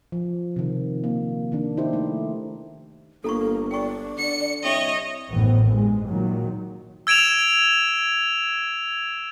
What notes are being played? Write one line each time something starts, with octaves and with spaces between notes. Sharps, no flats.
F3
C3 D#3
A#3
D#3 A#3 D4
D#4 E4 G4 C5
A3 D#4
G1 A#3 A4 A#5 C#6
D5 G5 C#6
D3 C#7
C2 C#5 D#5 E5 G5
A1 F#2 A2 D#3 B3 C4
G2 G#3
A#2 D#3 F#3
E6 G#6 D7 E7 F7